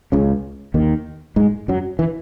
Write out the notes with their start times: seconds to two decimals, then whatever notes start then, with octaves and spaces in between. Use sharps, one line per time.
0.12 C#2 C#3
0.74 D#2 D#3
1.36 G#2 G#3
1.68 F#2 F#3
1.99 E3